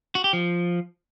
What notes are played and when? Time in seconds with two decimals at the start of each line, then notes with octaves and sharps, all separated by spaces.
0.15 F#4
0.24 G4
0.33 F3